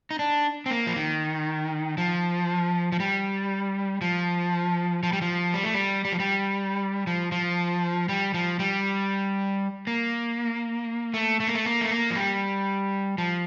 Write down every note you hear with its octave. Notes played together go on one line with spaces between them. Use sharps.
D#4
D4
C4
A#3
F3
D#3
F3
F3
G3
F3
F3
G3
F3
G3
A3
G3
G3
F3
G3
F3
F3
G3
F3
G3
A#3
A3
A3
A#3
A3
A#3
A3
A#3
F3
G3
F3